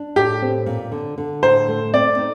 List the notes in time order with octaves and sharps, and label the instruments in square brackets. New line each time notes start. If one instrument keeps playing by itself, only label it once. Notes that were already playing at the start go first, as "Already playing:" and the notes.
Already playing: [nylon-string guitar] D4
[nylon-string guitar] A2 [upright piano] G4
[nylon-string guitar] C4
A#2
D3
D3
[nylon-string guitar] A2 [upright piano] C5
[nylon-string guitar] A3
[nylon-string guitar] C4 [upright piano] D5
[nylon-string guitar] D#4